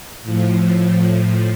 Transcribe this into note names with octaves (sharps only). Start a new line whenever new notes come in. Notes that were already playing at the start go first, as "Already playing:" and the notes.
A2 F3